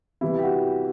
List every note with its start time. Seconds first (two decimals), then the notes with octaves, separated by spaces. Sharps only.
0.21 C3 E3 G3 E4
0.38 G4
0.43 F#4
0.64 G4